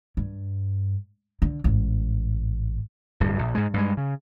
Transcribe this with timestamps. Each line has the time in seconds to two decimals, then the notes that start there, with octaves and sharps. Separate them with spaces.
0.17 G2
1.42 D3
1.64 A1 G#2
3.20 D1 G2
3.39 A#1
3.55 G#2 G#3
3.74 G2 G#3
3.97 C#3